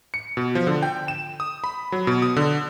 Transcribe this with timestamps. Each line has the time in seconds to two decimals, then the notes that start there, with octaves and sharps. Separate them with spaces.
0.14 C#7
0.37 B2
0.55 F3
0.67 D3
0.83 G5
1.08 E7
1.40 D#6
1.64 B5
1.92 F#3
2.07 B2
2.22 D#6
2.36 D3